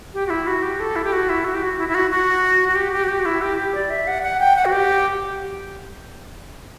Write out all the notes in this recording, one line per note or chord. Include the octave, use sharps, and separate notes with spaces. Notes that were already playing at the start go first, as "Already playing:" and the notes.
G4
F#4
E4
F#4
G4
A4
E4
G4
F#4
E4
F#4
G4
F#4
E4
E4
F#4
F#4
F#4
G4
G4
F#4
G4
F#4
E4
G4
G4
D5
E5
F#5
F#5
G5
F#5
F#4
G4